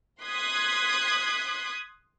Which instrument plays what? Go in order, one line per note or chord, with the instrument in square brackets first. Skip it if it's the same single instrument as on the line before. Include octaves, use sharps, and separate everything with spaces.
[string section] C6 D#6 F#6 G#6 B6